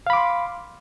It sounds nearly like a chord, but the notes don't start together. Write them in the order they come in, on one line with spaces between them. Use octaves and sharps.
F5 B5 D6 C6